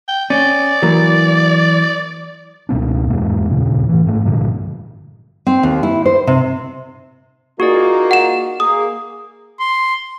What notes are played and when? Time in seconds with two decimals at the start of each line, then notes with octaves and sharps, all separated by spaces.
0.08 G5
0.30 C#4 D5
0.82 E3 F#3 A#3
2.69 C#2 B2 C4 D4
3.10 E2 G#2 G#3 A#3
3.50 D#2 A#2 C#3
3.89 A2 E3
4.06 G#1 G#2 A3
4.25 G2 A#2 D3 F3
5.47 C4
5.63 D#2
5.83 E4
6.05 C5
6.27 C3
7.60 A#3 D#4 F4 F#4 G#4 D5
8.11 F#5 E7
8.60 A#3 G#4 D#6
9.59 C6